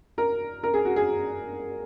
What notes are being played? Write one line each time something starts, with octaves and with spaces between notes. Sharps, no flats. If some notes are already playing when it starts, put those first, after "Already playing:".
A#4
A#4
G#4
F#4
G#4